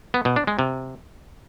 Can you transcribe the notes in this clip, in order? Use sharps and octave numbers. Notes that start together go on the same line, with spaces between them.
B3
B2
D4
G#3
C3